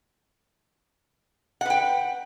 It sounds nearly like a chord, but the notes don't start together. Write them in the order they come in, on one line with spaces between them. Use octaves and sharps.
F#5 B4 G5